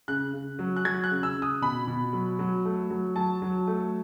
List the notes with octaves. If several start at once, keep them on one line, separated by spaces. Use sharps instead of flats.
C#3 F#6
C#3
F#3
F#6
F#3 G#6
F#6
C#3
E6
C#3
D#6
B2 B5
B2
F#3
F#3
A3
F#3
F#3 A5
F#3
A3